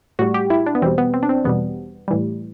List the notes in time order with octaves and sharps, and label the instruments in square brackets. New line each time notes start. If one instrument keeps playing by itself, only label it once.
[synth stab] A2 G3 F#4
G4
E4
D4
B3
E2 B2 G3 C4
B3
C4
D4
C4
E2 B2 G3 B3
A2 E3 G3